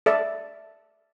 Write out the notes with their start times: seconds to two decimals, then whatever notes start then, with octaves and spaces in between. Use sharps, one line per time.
0.06 A4 D5 E5